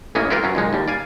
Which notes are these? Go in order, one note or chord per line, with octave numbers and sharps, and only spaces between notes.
A1 E3 A#3 C#4 D#5
E4 F4 G4 A#4 B4 F5
F#2 F#3 C#4
D#2 A#2 G#3 D#4
D#2 G3
D5 F5 G#5